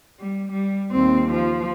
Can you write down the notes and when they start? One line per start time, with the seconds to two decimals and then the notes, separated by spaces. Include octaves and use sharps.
0.19 G3
0.52 G3
0.92 D#2 C4
1.31 F3